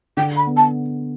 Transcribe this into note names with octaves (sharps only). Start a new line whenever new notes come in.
D3 G5
B5
B3
A5